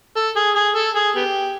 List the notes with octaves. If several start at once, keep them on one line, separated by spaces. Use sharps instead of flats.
A4
G#4
G#4
A4
G#4
B3 G4